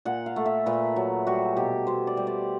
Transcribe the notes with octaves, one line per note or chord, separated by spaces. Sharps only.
A#2 F#5
F5
A3
E5
A#2 B4
F#3
G3 F#4
B2 G4
B2 C5
D5
G3
D5